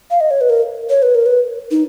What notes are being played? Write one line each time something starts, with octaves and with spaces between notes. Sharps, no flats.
F5
D#5
C#5
B4
A#4
C#5
B4
A#4
B4
D#4